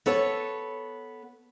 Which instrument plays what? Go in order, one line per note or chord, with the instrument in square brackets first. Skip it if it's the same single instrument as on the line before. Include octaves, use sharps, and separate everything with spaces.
[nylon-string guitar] B3 A4 C#5